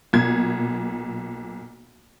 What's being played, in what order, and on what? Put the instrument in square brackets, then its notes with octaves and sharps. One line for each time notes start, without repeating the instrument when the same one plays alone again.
[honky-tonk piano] B1 A#2 G#6